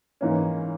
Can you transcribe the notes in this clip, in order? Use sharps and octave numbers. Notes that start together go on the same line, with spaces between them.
G#2 E3 A#3 C#4